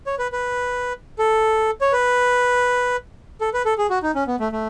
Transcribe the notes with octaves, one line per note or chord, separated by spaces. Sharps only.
C#5
B4
B4
A4
C#5
B4
A4
B4
A4
G#4
F#4
D#4
C#4
B3
A3
A3